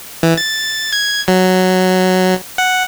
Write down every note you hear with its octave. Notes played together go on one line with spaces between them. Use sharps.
E3
A6
G#6
F#3
F#5